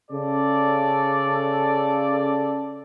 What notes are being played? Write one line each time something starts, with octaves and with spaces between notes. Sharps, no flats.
C#3 A4 D5